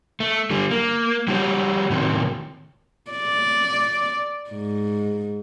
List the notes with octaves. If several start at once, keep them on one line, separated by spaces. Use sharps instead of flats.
A3
D3 G3
A#3
G3 E4 F#4 G4 C5 C#5
A2 C3 D#3 F#3
D5
G#2